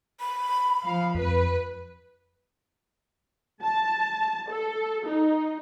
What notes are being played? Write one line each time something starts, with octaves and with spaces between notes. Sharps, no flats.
B5
F3 F5
F2 B4
A5
A4
D#4